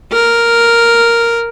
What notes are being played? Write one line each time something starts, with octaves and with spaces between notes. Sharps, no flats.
A#4